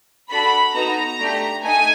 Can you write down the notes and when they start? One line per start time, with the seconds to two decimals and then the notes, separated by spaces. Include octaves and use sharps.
0.30 D4 F#4 A4 B5
0.74 B3 D#4 F#4 A4 A#5
1.20 A3 D4 G4
1.63 A3 D#4 G#5